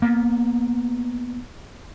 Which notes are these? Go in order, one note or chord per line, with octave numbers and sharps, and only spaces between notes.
A#3 B3